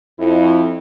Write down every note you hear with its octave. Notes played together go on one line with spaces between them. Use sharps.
F2 E4